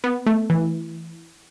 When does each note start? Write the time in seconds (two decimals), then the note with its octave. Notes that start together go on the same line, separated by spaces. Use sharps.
0.04 B3
0.27 A3
0.50 E3